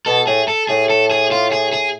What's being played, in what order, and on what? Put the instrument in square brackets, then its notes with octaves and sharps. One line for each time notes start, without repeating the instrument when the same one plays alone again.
[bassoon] B2 [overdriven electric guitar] A4
[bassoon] A2 [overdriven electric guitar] G#4
[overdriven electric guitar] A4
[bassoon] A2 [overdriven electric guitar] G#4
[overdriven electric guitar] A4
G#4
F4
G#4
G#4